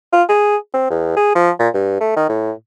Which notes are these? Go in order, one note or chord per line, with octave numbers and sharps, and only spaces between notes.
F4
G#4
C4
E2
G#4
F3
A#2
G2
A3
D#3
A2